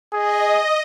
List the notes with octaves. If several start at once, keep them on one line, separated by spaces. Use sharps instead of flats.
G#4 D#5